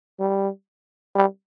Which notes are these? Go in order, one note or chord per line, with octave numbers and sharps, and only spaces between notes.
G3
G3